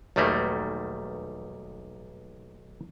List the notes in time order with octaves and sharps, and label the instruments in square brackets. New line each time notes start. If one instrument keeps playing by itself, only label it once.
[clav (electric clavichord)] B1 E2 D#3 G3 A3 A#3